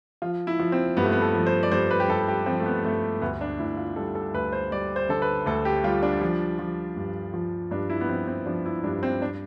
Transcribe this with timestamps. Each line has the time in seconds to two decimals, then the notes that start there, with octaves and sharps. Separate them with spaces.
0.22 F3 F4
0.47 E4
0.59 F3
0.72 C4
0.97 G2 B3
1.04 A3
1.12 B3
1.22 A4
1.34 F3
1.47 C5
1.63 D5
1.71 G2 C5
1.91 B4
2.00 G4
2.09 G2 A4
2.28 G4
2.46 F3 C4
2.60 A3
2.66 B3
2.84 G2 A3
3.21 D2 B3
3.41 D4
3.59 D2 E4
3.77 F4
3.96 G3 A4
4.15 A4
4.34 D2 B4
4.52 C5
4.71 G3 D5
4.96 C5
5.09 D3 A4
5.22 B4
5.46 D2 A4
5.65 G4
5.84 G3 F4
6.02 D4
6.21 F3
6.59 F3
6.96 G2
7.34 F3
7.71 G2 D4
7.90 E4
8.01 B3
8.09 F3 C4
8.27 C4
8.46 F3 D4
8.66 E4
8.84 G2 D4
9.03 C4
9.22 D4